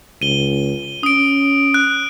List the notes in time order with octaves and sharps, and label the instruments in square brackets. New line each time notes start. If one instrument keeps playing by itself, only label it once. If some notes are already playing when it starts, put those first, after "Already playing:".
[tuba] C#2 [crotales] D#7 G7
[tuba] C#4 [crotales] D#6 D7
[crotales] F#6